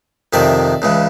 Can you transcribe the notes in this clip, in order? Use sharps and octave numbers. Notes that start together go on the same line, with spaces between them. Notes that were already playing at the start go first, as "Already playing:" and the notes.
F2 C3 D#3 D5 E5
C#2 C#3 E3